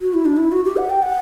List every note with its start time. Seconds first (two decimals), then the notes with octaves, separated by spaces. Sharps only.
0.01 F#4
0.14 E4
0.25 D4
0.37 E4
0.52 F#4
0.65 G4
0.77 F#5
0.90 G5
1.02 F#5